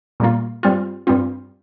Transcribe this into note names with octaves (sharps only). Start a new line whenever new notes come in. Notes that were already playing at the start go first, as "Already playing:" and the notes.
A#2 G3 A#3 F4
G2 G3 C4 F4
G2 G3 C4 F4